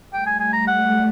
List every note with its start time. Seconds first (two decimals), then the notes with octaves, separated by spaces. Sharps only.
0.13 G3 A3 G5
0.26 G#5
0.40 G#5
0.53 A#5
0.68 F#5